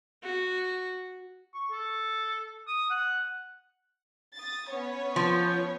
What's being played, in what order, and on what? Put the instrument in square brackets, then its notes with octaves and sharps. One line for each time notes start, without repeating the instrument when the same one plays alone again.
[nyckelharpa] F#4
[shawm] C#6
A4
D#6
F#5
[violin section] D#6 A6
B3 C#4 C#5
[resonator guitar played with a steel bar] F3